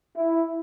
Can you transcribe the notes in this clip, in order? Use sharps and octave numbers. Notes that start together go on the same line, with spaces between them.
E4